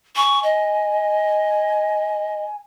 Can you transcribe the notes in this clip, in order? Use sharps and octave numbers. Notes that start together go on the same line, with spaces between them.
G#5 C#6
D#5